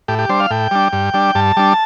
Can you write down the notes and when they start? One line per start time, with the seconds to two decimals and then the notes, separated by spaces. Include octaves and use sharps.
0.08 A2 G4
0.19 G4
0.29 G3 D4 C5
0.40 F5
0.51 A2 G5
0.71 G3 D4
0.93 G2
1.14 G3 D4
1.35 G2 A5
1.57 G3 D4